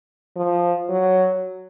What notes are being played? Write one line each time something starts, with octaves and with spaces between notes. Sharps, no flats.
F3
F#3